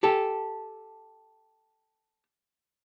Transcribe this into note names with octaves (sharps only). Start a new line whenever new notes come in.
G4 A4